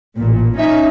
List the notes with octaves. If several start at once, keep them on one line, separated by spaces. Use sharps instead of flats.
A1 A#2
C#4 D#4 E5